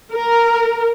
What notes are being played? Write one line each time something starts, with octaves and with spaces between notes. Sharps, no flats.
A#4